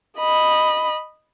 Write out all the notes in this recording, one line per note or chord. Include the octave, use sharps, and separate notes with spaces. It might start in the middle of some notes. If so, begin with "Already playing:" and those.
D#5 B5